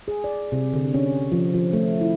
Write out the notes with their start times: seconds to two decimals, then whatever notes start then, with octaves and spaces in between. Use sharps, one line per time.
0.08 G#4
0.24 D5
0.52 C3
0.73 D3
0.94 C#4
1.32 F3
1.54 F3
1.73 A3
2.01 E4